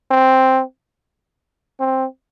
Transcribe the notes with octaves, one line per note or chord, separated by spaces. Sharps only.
C4
C4